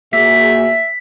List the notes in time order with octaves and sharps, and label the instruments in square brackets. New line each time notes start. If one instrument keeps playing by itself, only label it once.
[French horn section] A#2 F#4 G#4 [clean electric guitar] A#3 [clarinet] E5 [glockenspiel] B6